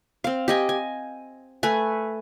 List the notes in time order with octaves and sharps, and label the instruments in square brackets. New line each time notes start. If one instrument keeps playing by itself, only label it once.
[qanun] C4 F5
G4 D#5 G#5
G#5
A3 B4 G#5